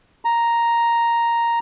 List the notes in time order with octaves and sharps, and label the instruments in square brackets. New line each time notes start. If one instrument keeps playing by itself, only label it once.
[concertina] A#5